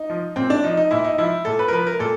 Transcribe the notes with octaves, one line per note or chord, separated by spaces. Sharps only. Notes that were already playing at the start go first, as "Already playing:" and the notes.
Already playing: D#4
F3
A#2 C4
D4
F3 D#4
D#4
A#2 E4
D#4
F3 E4
A#2 A4
B4
A#4
F3 B4
A#4
A#2 A4